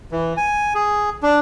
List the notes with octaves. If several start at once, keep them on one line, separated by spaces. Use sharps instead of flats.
E3
G#5
G#4
D4